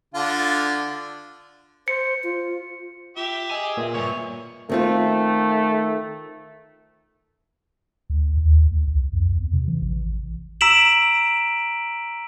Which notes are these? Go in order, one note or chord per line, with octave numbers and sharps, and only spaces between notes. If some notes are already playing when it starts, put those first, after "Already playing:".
D3 F4
C5 C#7
F4
F4 G4 E5
G#4 D#5 G#5 E6
A#2 B4 E5
C#2 G2 C#5
D#3 A3 C4 F4
D2
D#2
D2
C2
F2
E2
C3
E3
A1
A#5 E6 B6 D7 E7 F#7